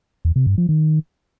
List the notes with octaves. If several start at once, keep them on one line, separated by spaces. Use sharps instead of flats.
E2
C3
G2
F3
D#3